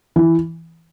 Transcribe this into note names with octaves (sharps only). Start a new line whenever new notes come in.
E3